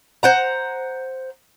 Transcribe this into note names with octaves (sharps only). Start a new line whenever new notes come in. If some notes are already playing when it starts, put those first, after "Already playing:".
C5 F#5 A#5